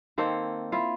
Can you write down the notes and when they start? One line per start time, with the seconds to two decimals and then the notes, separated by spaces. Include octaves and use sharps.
0.18 D#3 A#3 C4 A4
0.72 E4 F4